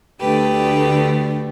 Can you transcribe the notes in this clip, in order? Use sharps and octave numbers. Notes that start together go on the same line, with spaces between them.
D2 D3 A3 G4 B4